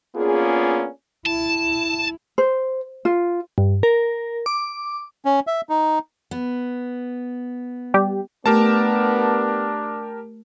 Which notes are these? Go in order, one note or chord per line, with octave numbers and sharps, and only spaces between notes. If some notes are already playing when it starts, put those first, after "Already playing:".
A#3 B3 C#4 D4 F4 G#4
E4 A5
C5
F4
G2
A#4
D6
C#4
E5
D#4
B3
G3 G4
A3 B3 D4 G4 A#4 A5